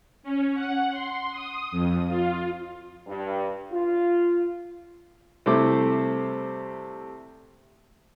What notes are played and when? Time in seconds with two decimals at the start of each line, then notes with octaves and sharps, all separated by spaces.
0.23 C#4
0.54 F#5
0.91 C6
1.31 D#6
1.71 F2
2.08 F4
3.06 G2
3.72 F4
5.46 C3 G3 A3 E4 C5 D6